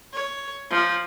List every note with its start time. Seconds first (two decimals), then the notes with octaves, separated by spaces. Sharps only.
0.13 C#5
0.71 F3